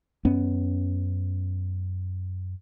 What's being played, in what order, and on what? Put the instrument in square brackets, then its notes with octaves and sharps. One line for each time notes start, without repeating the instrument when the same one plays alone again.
[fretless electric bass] F#2 B3 C#4